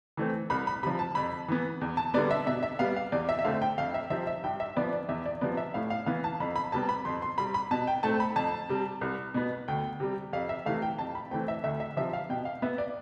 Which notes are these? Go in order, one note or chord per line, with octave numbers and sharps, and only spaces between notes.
E3 A3 C4
C2 B5
B5
C3 F3 B5
A5
F2 B5
E3 B3
E2
A5
D3 G3 B3 D5
E5
B2 E5
E5
G3 B3 F5
F5
E2 D5
E5
E5
D3 A3 C4 F5
G5
F2 F5
E5
C3 F3 C4 E5
E5
G2 G5
E5
F3 B3 D5
D5
E2 E5
D5
C3 F3 B3 D5
E5
A2 F5
F5
E3 B3 F5
A5
F2 B5
B5
C3 G3 B3 A5
B5
F2 C6
C6
C3 G3 B5
B5
B2 A5
G5
A3 C4 A5
B5
F2 A5
C3 G3
C2
B2 B3
D2 G5
C3 G3
F2 F5
E5
C3 E3 A3 F5
G5
F2 A5
B5
E3 A3 C4 G5
E5
D2 E5
E5
C3 F3 E5
F5
B2 G5
F5
B3 E5
D5